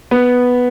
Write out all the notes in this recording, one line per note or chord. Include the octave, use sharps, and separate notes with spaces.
B3